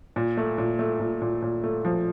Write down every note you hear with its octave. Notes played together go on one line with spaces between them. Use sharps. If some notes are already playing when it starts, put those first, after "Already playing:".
A#2
A3
A#2
A3
A#2
A#2
A#2
A3
F3